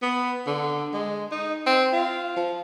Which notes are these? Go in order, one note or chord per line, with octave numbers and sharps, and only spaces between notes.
B3
D3
G#3
D#4
C4
F4
F3